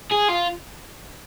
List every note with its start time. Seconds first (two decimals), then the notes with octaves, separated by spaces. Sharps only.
0.12 G#4
0.29 F4